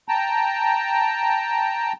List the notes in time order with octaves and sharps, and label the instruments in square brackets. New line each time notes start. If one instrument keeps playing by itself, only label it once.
[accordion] G5 A5 A#5